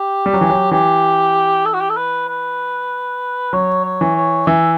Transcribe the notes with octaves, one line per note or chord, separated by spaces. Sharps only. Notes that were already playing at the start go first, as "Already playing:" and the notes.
Already playing: G4
G3
F#3
E3
F#3
E3 G4
A4
F#4
G4
A4
B4
B4
F#3 C#5
C#5
E3
C#5
E3 E5